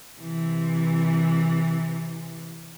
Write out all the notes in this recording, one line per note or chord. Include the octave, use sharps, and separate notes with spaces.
C3 E3